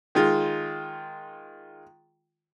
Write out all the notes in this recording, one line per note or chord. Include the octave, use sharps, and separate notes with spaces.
D#3 G#3 F4